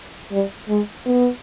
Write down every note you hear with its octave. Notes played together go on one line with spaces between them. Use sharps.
G3
G#3
B3